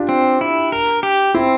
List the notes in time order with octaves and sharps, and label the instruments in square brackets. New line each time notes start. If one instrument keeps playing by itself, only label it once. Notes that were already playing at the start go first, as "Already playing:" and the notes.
Already playing: [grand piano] D4 F4 G4
[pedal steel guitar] C4
E4
A#4
G4
[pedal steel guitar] C4 [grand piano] E4